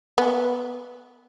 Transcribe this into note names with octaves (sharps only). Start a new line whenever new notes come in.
B3